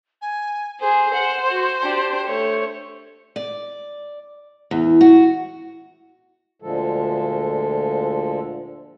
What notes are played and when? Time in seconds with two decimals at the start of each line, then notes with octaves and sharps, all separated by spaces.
0.22 G#5
0.80 G#4 C5
1.14 F#5
1.50 F#4
1.83 D4 G4
2.26 A3 C#5
3.36 D5
4.71 E2
5.01 F#4
6.62 D2 A#2 D3 F3 G#3 A4